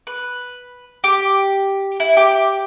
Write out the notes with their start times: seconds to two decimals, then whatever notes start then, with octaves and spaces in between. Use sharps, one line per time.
0.07 B4
1.04 G4
2.00 E4
2.17 G4